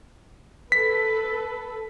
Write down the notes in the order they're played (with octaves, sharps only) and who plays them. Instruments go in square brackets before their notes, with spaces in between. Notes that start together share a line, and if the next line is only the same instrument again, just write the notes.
[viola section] A4 B4 [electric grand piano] B6